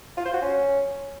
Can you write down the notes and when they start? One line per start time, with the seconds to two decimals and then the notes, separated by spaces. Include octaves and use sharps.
0.17 F4
0.25 C5
0.33 F#4
0.42 C#4